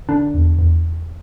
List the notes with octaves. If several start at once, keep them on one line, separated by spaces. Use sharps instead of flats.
D3 D4
E2
E2